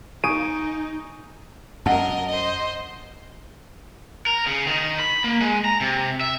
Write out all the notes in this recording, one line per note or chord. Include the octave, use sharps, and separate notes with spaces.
D#4 G#5 C#6 D#6 D7 D#7
F#2 A#4 D#5 F#5 A5
C5 D#5
A#4
C#3
D#3
B5
A#3
G#3
A#5
C3
E5